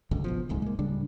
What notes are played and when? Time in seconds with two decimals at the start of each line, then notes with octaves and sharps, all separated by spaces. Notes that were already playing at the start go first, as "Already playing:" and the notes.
0.11 G1 C#2 F#2 D3
0.24 G#1 B2 F3
0.49 D1 C2 G#2 G#3
0.62 G#3 A#3
0.79 D1 C#3 G3 D4